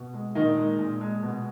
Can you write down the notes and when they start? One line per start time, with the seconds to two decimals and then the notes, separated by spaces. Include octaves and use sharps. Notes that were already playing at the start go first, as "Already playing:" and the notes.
Already playing: B2
0.14 G#3
0.35 A#2 D#3 D#4
0.57 G#3
0.79 A#2
1.01 G#3
1.23 B2